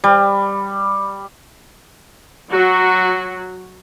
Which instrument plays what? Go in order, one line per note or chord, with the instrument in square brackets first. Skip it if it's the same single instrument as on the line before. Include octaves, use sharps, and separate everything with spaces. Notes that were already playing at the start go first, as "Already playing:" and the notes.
[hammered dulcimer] G3
[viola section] F#3 F#4